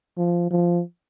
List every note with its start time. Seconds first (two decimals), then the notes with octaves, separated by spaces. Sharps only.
0.17 F3
0.51 F3